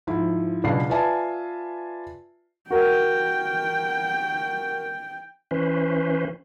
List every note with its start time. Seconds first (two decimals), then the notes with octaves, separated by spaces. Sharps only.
0.07 G#2 F3 E4
0.64 C#2 B2 F#3 D4 C7
0.89 F4 B4 D5 E5 G#5 A5
2.71 F#4 A#4 F#5 G5
5.51 E3 C#4 B4 C5